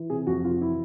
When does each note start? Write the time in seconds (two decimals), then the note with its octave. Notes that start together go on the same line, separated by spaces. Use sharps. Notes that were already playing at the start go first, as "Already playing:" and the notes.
Already playing: E3
0.10 C3 G#4
0.27 F2 F#4
0.44 C3 F4
0.61 E3 E4